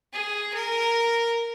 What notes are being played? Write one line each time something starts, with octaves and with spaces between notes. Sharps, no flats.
G#4
A#4